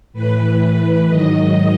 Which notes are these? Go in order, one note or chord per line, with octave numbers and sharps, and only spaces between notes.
A2 E3 B4
B4
G#2 D#3 F#3 D#5